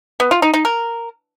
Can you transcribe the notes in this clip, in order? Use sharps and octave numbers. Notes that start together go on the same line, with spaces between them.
B3
F4
D#4
D#4
A#4